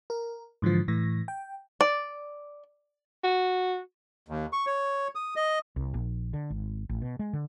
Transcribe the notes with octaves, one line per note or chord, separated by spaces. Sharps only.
A#4
G#2 D3 E3 F3
A2 E3 A#6
G5
D5
F#4
D#2
C#6
C#5
D#6
D#5
C2
A#1
D3
G#1
A1
B2
G#3
D3